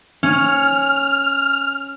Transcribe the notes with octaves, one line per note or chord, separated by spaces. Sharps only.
C#4 F6